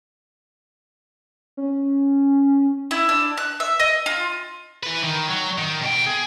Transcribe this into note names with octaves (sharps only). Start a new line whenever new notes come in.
C#4
E4
D4
F#6
E5
D#5
F4
E4 B4
D#3
F#3
D#3
B2 G5
G#4